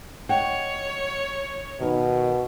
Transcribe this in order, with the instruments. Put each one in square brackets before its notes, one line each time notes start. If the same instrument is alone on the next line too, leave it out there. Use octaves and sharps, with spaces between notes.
[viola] C#5 [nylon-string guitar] D#5 F#5 G5
[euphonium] B2 [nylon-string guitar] D#3 A#4 B4